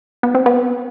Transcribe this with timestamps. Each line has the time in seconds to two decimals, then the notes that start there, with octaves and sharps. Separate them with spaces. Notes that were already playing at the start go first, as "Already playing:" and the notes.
0.23 B3
0.35 C4
0.46 B3